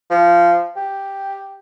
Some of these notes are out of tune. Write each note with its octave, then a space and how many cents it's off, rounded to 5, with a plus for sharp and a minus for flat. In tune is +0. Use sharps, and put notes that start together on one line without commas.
F3 -15
G4 +0